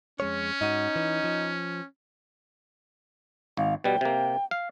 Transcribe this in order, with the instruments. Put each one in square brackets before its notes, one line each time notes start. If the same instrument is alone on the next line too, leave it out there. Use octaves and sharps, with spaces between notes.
[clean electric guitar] F2 G#3 C#5 [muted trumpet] C#4
[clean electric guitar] G#2 F#4 [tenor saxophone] D#4
[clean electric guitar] E3
F3
[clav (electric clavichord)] G#1 [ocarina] F5
[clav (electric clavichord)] B2 G3 [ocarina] G5
[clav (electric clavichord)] C3 A#3
F5